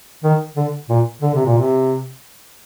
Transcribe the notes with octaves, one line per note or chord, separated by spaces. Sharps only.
D#3
D3
A#2
D3
C3
A#2
C3